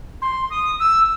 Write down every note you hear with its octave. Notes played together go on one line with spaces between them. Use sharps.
C6
D#6
E6